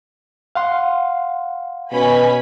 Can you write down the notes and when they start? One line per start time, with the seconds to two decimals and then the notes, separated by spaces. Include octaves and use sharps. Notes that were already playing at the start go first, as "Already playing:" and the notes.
0.55 F5 F#5 C6
1.92 B2 C#4 G#5 B5